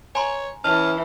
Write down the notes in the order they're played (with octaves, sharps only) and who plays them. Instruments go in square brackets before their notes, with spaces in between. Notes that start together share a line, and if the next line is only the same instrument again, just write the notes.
[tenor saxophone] C#5 [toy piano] G#5 A#5 C6
[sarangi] E3 [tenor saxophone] C#4 [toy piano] A5 [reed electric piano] F6